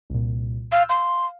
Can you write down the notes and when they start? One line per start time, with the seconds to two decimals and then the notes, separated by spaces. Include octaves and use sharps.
0.10 C2 A#2
0.72 F5 E6 F6 G6
0.89 F5 C6